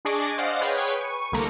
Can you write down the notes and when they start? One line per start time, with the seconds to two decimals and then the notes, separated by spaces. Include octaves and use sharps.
0.05 D4 G#4 D5 D#5 C#6 D6
0.38 C5 D5 D#5 F5 F#5
0.61 G#4 B4 C#5 G5
1.00 C#6 C#7 D#7
1.32 C2 D3 A3 A#3 A#5 D7